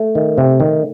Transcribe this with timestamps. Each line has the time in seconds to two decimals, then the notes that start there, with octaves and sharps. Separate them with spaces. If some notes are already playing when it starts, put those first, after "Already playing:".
Already playing: A3
0.15 D#3
0.38 C3
0.60 D#3